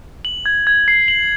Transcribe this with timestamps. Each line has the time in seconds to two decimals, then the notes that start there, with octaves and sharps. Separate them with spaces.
0.25 F#7
0.46 G#6
0.67 G#6
0.88 C7
1.08 F#7